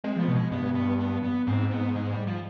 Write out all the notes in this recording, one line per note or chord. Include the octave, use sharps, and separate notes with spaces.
G#3 C4
F3
B3
B2
G#3
G2 B3
B3
B3
B3
G#2 C4
B3
G#3
G3
F3